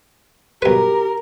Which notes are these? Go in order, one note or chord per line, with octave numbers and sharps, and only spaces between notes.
B1 G4 A#4 B4